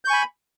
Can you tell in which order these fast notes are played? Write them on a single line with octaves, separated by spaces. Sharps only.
G6 C#6 G#5 B5